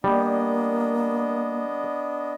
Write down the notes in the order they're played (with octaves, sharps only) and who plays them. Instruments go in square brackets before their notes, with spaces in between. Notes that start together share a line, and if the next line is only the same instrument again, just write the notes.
[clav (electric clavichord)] G3 [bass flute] A#3 [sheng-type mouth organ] B3 D4 D#5